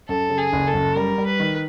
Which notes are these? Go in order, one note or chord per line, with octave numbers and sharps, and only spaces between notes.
F#2 A4
C#3
G#4
F#1
A4
F#2
G3 A#4
G3
B4
D#3